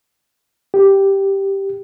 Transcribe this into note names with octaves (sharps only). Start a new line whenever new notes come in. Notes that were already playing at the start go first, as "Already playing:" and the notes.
G4